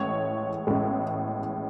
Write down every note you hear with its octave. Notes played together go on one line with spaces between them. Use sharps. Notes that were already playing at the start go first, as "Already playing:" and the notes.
Already playing: A1 A2 G#3 C#5
A1 A2 G#3